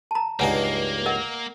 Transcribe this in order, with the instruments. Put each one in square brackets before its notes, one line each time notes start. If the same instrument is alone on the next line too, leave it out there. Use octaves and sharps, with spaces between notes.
[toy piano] A5 A#5
[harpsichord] C#2 G2 D#4 [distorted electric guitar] A#3 [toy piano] C#5 F#5 G#5
[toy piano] A#4 D#5 F#5